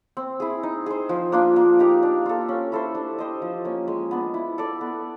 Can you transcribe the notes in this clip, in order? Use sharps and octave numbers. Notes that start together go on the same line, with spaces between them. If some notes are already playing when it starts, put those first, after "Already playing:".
C4
E4 G#4
D#4
G#4 C5
F3
A#3 D4 F4
A#3
D#4 G4 A#4
D4
F4 A4
C#4
E4 A4 C5
D4
G4 C5 D#5
F3
A#3 C#4
G#3
B3 D4
E4
A4 D5
B3